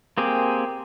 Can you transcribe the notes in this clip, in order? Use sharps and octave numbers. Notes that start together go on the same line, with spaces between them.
A#3 C4 G4 G#4